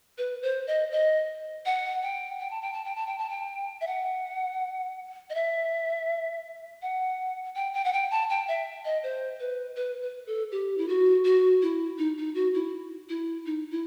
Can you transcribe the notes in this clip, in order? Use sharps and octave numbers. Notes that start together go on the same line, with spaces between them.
B4
C5
D#5
D#5
F#5
G5
G5
A5
G5
A5
G5
A5
G5
A5
G5
E5
F#5
D#5
E5
F#5
G5
G5
F#5
G5
A5
G5
E5
D#5
C5
B4
B4
B4
A4
G4
E4
F#4
F#4
E4
D#4
D#4
F#4
E4
E4
D#4
E4